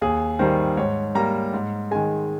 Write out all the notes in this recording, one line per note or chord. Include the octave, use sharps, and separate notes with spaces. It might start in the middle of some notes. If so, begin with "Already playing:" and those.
D#2 G#4
D#3 G3 A#3 C5
G#2 C#5
G3 A#3 A#5
G#2
D#3 G#3 G#5